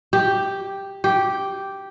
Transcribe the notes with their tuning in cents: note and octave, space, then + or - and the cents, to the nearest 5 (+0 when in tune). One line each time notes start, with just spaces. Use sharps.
G4 +0
G4 -5